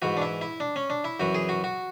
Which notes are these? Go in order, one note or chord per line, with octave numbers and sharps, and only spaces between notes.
G#2 E3 F#4
D4
E4
E4
D4
C#4
D4
E4
F#2 E3 F#4
G#4
F#4
F#4